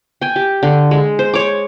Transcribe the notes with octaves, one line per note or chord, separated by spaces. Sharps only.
G5 G#5
G4
D3
G#3
C5
C#5 D6